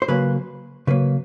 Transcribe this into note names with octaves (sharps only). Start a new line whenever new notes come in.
C5
C#3 F#3 A#3 B4
C#3 F#3 A#3 B4